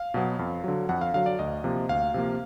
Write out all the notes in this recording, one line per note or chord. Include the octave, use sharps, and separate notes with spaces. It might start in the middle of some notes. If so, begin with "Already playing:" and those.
Already playing: F5
B2 F#3 B3
F2
D3 F#3
F2 F#5
F5
D3 F#3 F5
D5
D2 D#5
C3 F3 A#3
D2 F5
C3 F3 A#3